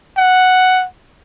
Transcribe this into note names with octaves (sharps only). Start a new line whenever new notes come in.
F#5